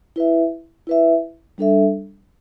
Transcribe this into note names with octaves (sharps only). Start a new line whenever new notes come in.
E4 B4 E5
E4 B4 E5
G3 D4 A4 E5